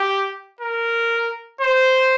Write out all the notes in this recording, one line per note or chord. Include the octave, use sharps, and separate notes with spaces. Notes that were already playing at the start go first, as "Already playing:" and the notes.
Already playing: G4
A#4
C5